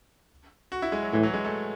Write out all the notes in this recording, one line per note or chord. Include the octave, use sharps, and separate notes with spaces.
F#4
E4
G#3
F#3
A2 E3
F#3
G#3
A3